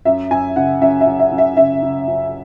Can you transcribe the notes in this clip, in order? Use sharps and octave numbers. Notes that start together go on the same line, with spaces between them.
F#2 E5
F#2 G#5
C#3 F#5
F#2 E5
E5
F#2
E5
F#2
E5
C#3 E5
C#3
F#2